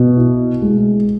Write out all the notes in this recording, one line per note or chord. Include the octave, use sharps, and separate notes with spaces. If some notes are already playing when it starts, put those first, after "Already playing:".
Already playing: B2
E4
G#3